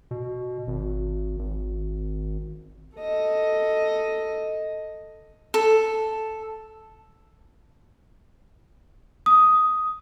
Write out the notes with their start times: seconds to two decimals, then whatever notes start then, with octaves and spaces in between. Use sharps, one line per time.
0.11 B2
0.67 G#1
1.39 G#1
2.98 A4 D#5
5.54 A4
9.26 D#6